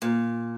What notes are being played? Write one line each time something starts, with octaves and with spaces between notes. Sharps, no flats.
A#2